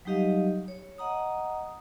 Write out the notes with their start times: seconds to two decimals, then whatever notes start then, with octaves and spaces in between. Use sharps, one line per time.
0.05 F#3 G3 D#4 G4 D#5 F5
0.68 C#5
0.98 D#5 F#5 A#5 D#6